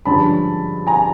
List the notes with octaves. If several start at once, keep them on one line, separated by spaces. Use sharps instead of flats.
G2 D3 F3 G#3 C#4 A5 B5
G#5 A#5